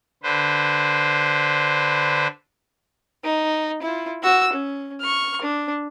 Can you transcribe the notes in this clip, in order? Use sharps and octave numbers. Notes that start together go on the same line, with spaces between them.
D3 B4 C5
D#4
E4 F4
F#4 E6
C#4
C#6 F6
D4